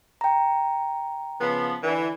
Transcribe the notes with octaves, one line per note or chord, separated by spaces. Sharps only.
G5 A#5
C#3 F3 B3
D3 E3